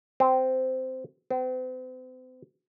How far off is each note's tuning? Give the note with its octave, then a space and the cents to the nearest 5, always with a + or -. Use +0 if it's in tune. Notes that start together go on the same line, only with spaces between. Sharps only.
C4 -10
C4 -40